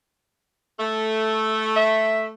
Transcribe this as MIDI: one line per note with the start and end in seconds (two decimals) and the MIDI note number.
0.80 2.32 57
1.76 2.25 76